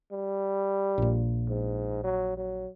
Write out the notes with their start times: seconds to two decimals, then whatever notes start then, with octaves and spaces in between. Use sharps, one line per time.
0.12 G3
0.98 A#1 A#2
1.49 G#2
2.04 F#3
2.37 F#3